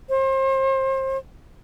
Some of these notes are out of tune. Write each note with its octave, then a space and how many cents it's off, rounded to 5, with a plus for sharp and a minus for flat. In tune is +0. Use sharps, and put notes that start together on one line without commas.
C5 +35